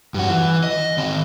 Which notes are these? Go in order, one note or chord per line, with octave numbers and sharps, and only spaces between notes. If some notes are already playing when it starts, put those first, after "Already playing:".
G2 F#4
E3
D#5
D#3 C4